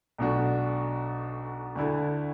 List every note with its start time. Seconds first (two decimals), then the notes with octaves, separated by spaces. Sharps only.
0.18 B1 B2 A3 D4 F#4
1.75 D2 D3 A3 E4 A4